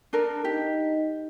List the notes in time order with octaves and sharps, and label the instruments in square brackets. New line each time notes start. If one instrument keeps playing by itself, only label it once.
[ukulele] D4 A4 A#4
[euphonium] D#4 [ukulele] G4